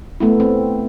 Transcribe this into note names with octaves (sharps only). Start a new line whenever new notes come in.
A3 B3 E4
C4